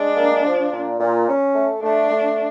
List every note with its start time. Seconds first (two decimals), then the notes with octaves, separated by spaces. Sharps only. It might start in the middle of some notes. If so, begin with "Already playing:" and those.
Already playing: G#3 D4
0.16 A#3
0.45 F3
0.72 A#2
1.00 A#2
1.28 C#4
1.55 A3
1.82 A3 D4
2.11 A3